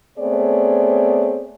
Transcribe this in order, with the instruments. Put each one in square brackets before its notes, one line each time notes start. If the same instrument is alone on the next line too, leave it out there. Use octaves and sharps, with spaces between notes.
[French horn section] A3 B3 C4 G#4 C#5 D5